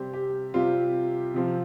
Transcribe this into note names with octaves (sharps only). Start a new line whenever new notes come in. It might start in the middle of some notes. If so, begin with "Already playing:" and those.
Already playing: C3 G3 C4 G4
G4
C3 G3 C4 F4
C3 F3 C4